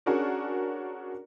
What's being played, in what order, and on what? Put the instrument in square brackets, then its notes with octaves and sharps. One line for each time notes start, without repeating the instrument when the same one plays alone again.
[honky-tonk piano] C#4 D4 F#4 G#4 A#4 D5